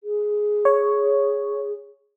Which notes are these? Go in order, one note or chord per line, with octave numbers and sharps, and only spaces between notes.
G#4
C#5